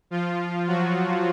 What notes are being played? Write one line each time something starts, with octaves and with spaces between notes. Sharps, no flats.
F3 F4
F#3 F#4